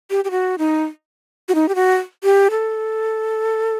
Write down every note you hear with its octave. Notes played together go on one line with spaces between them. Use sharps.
G4
G4
F#4
D#4
F#4
D#4
G4
F#4
G4
A4